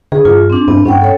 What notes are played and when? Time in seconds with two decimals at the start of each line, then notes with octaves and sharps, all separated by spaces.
0.12 D3 G#4
0.25 G2 F4
0.50 C4 D4
0.68 G2 B3
0.85 G2 C#4 F#5 G5
1.01 A4 C#5